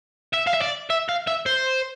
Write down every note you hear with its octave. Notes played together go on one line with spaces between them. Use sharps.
E5
F5
E5
D5
E5
F5
E5
C5